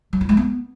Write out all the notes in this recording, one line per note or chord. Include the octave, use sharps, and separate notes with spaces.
F#3
F4
G#3
B3